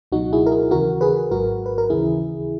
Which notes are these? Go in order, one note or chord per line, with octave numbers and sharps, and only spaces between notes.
C#2 B2 F#3 D#4 F#4
E4 G#4
A#4
E4 G#4
D#2 C#3 E3 F#4 A#4
G#4 B4
G#1 G#2 F#3 F#4 A#4
B4
A#4
D#2 C#3 E3 E4 G#4